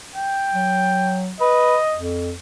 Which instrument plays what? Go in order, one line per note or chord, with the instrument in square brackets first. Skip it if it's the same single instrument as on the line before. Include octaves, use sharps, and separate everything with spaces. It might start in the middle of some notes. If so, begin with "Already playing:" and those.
[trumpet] G5
[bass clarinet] F#3
[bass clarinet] B4 [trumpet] D#5
[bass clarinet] F2